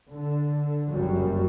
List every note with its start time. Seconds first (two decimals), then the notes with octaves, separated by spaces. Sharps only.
0.10 D3
0.89 F#1 F#2 F#3 G3